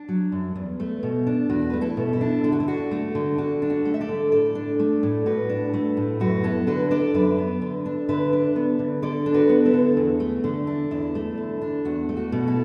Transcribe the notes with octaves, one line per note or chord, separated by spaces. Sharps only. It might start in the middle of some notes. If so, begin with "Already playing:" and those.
Already playing: D4
F#3
F#2
E2
A3
B2
D4
E2 F#4
A3 B4
E4 A4
B2
E4
D4
D3 A4
F#4
E4
D4 F#4
A3
D3
D3 F#4
D4
F#4
A3
E5
A4 D5
D3
A2 A4 D5
D4
A3
A2
A2 F#4 B4
D4
A3
A2
F#2 F#4 B4
B3 E4 A4
D3 F#4 B4
D4 A4 D5
F#2 B4 E5
B3
D3
D4
D3 B4 E5
D4
B3
D3
D3 A4 D5
D4
F#4 B4
B3
E4 A4
D3
E2
A3
D3
D4
E2 E4
A3
D3
D4
E2 F#4
A3
F#4
B2
E4 A4